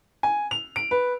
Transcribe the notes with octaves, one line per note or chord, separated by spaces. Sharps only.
G#5
F7
D7
B4